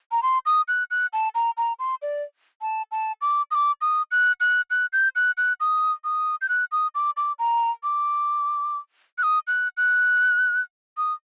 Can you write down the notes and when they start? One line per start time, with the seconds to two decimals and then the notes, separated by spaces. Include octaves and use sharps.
0.12 A#5
0.23 C6
0.46 D#6
0.68 F#6
0.91 F#6
1.13 A5
1.35 A#5
1.57 A#5
1.79 C6
2.02 D5
2.61 A5
2.91 A5
3.21 D6
3.51 D#6
3.54 D6
3.81 D#6
4.11 F#6
4.40 F#6
4.70 F#6
4.93 G6
5.15 F#6
5.37 F#6
5.60 D#6
6.04 D#6
6.41 G6
6.49 F#6
6.72 D#6
6.95 D6
7.17 D6
7.39 A#5
7.83 D6
9.18 F#6
9.23 D#6
9.47 F#6
9.77 F#6
10.97 D#6